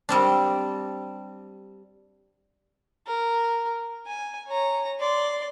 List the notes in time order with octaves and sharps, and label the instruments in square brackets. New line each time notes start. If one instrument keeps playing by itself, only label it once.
[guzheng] G3 C4 D4
[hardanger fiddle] A#4
G#5
C#5 A#5
D5 C6